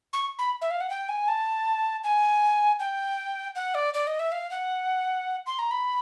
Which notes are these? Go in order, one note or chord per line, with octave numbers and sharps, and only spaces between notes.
C#6
B5
E5
F5
F#5
G5
G#5
A5
G#5
G5
F#5
D5
D5
D#5
E5
F5
F#5
C6
A#5
B5